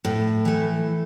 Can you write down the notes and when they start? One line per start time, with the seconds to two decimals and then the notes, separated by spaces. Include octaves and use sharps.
0.05 A2
0.45 E3 A3